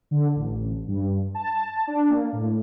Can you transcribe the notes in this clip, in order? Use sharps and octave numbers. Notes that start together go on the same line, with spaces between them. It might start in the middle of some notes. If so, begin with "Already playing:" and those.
D3
A1
G2
A5
D4
A#3
A2